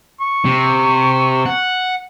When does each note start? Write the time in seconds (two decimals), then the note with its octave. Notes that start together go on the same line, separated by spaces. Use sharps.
0.21 C#6
0.45 C3
1.46 F#5